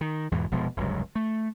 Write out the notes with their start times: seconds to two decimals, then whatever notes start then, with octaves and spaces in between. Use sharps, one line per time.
0.01 D#3
0.32 E2 G#2 B2 E3
0.51 F1 B2 F3 G#3
0.77 F1 C#2 G2 F#3
1.15 A3